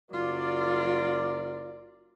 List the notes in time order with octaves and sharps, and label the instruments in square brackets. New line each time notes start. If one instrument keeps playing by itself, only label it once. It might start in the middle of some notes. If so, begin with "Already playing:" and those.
[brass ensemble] F#1 A#4 D5 [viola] F#3 F4